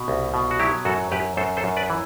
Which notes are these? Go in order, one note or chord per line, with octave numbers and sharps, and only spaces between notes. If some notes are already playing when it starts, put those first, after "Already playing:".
Already playing: B2
C2
B2
F#4
F#3 E4 G4
F#2 F#4 A4
F#2 G4 B4
F#2 A4 C5
A4 C5
F#2
B4 D5
E3